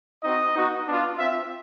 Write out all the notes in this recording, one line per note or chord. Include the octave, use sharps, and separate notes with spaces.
C4 D#4 F#4 D#5
B3 D#4 F#4
B3 D4 F4
C4 F4 E5